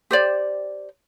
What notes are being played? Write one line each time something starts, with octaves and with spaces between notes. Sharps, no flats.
G4 C5 D5